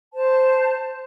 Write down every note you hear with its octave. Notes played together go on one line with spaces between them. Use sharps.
C5 A5